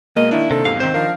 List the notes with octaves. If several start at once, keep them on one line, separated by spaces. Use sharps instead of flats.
B2 G#3 A#3 D#5
D#3 D4 E4
C3 A4
E2 G#2 C3 F5
D#3 C4 C5
F3 D4 A#4 F5